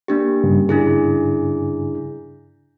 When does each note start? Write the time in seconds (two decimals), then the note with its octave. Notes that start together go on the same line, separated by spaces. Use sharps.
0.08 A#3 D4 G4
0.44 G2 C#3
0.69 D4 E4 G#4